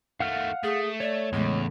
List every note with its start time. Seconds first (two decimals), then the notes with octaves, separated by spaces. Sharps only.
0.20 D#3 A3 F5 F#5 F6
0.63 A3 G#4
1.00 C#5 D5
1.33 E2 A2 C#3 G#3